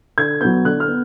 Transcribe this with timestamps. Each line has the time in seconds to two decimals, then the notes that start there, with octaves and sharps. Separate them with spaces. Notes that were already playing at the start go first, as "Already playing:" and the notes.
0.18 D3 G#6
0.41 F#3 B3 G6
0.65 D3 F#6
0.80 F6
0.88 B3